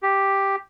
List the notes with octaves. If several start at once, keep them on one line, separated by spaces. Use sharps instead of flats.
G4